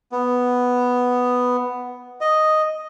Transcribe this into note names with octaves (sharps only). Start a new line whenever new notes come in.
B3
D#5